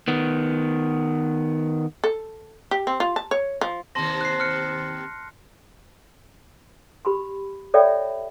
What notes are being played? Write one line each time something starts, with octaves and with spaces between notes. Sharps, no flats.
D#3 B3
A4
G4
C4
F4
A5
C#5
F3
D#2 C3 C4 A5 C6 A#6
F#6 C7
F6 F#6 C#7
G4 B5 C6
A4 C#5 D5 E5 G5 B5